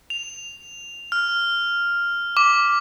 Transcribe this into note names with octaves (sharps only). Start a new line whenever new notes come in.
F7
F6
D6